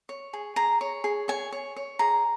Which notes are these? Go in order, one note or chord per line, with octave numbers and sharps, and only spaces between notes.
C#5
G#4
G#4 A#5
C#5
G#4
C#5 G#5
C#5
C#5
G#4 A#5